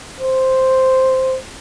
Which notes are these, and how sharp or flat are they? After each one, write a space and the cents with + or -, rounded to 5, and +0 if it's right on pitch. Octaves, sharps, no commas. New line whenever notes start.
C5 +0